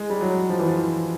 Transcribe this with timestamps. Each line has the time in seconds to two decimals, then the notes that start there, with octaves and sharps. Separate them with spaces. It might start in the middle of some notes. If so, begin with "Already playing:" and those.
Already playing: G#3
0.10 G3
0.21 F#3
0.49 F3
0.59 E3
0.68 F3